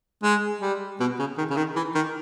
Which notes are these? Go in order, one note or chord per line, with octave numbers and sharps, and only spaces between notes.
G#3
G3
B2
C#3
D#3
C#3
D#3
E3
D#3